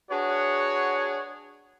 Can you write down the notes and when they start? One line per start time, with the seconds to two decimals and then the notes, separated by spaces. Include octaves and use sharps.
0.10 D4 F#4 G#4 B4 C#5